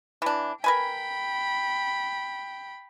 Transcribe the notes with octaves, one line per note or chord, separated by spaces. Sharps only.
E3 D4
A#4 B4 G5 G#5 B5